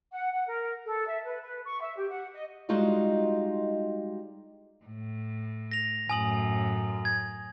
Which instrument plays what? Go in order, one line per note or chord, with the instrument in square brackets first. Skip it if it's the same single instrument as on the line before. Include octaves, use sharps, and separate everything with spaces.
[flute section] F#5
F#5
A#4
A4
E5
B4
B4
C#6
E5
G4
F#5
D#5
[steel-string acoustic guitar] G3 G#3 D#4 F4 F#4 D#5
[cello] A2
[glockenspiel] A#6 F7
[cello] F#2 A2 [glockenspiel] G#5 D#6 F#7
[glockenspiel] G#6